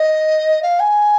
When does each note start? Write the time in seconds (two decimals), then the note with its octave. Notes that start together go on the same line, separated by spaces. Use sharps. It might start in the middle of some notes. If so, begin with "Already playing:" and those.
Already playing: D#5
0.63 F5
0.80 G#5